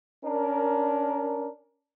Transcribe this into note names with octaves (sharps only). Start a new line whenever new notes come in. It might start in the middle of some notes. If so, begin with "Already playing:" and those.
C#4 D4 A#4